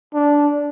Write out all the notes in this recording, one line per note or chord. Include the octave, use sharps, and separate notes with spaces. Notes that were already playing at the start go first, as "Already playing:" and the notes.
D4